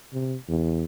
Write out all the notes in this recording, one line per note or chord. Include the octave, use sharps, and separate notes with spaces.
C3
E2